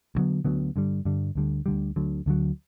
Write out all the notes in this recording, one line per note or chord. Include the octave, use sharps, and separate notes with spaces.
D2 D3 F#3 B3
D2 D3 F#3 B3
G2 D3 G3
G2 D3 G3
D2 D3 G3
D2 D3 G3
D2 D3 F#3
D2 D3 F#3